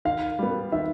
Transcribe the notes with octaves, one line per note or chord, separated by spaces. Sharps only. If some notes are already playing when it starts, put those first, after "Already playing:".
D#3 F5
G3 B3
D#3 E5